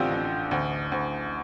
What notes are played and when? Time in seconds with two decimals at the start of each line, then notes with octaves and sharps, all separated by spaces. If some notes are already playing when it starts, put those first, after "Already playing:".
Already playing: A1 D3 C4 F4 G4
0.12 A1
0.51 D2
0.92 D2